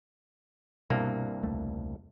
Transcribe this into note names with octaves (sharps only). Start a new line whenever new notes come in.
C2 G2 B2 A#3
E1 C#2 A3